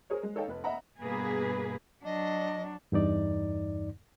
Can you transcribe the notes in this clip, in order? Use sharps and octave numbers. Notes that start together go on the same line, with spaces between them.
G#4 A#4 C5 C#5
G#3
D#4 A4 C#5 D#5 F5 G5
F1 B4
D#5 E5 F#5 A#5 B5
G2 B2 A#3 G#4 B4
F#3 D4 D#5
E2 G2 D#4 D5